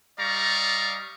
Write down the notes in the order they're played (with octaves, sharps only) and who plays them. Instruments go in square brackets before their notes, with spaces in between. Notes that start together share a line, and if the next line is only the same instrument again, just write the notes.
[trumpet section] G3 D5 D#5 F5 A#5 C#6